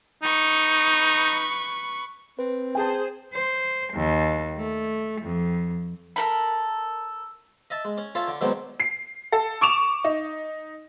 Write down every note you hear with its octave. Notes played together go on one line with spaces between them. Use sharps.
D#4 B4 C#6
C4 B4
G#4 C5 G5 A5
C5
D#2
A3
F2
A4 A#4 B5
D#5 E5 A5
G#3
C#4
C#4 F4 A4 E5
D3
B2 D3 D#3 F#3 G#3 C4
C7
A4
C#6 D6 E7 F7
D#4